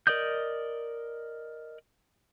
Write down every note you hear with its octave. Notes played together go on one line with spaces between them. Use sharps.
A#4 D5 D#5 D#6 G6